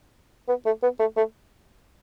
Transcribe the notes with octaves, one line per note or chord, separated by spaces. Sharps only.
B3
A3
B3
A3
A3